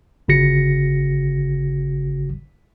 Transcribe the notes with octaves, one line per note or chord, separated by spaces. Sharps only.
G1 C#3 F#4 A#6 C#7